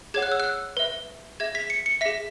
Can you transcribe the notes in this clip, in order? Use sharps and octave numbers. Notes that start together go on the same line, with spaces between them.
G#4 C#5 F#5 G#6
F#6
E6
F#6
B4 E5
G#4 E5 G#6
B6
C#7
C#7
G#4 E5 B6